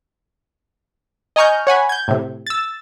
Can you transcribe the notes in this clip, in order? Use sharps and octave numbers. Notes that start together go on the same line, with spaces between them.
D#5 G#5 A#5 C#6 F6 G6
C#5 F#5 G#5 B5
G6 G#6
A2 C3
E6 A6